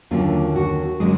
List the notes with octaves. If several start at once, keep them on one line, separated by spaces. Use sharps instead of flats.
D#2 D3 F#3 A#3 C#4 F4
F#4
D3 F#3 G#3 A#3 C#4 G#4